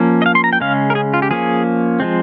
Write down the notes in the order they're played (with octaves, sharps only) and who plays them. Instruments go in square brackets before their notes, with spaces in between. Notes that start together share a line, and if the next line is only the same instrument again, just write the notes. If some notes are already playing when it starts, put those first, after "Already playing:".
Already playing: [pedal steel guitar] F3 A#3 C#4
D#5
F5
C6
A#5
G5
C#3 G#3 C#4 F5
A#4
G#4
F4
G4
F3 A#3 C#4 G#4
F3 G#3 C4